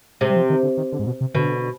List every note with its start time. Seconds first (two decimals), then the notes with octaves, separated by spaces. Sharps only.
0.21 C3 G#3
0.30 G3
0.36 F3
0.50 D#3
0.63 D3
0.77 D#3
0.92 D3
0.99 G#2
1.07 B2
1.21 C3
1.34 B2 D3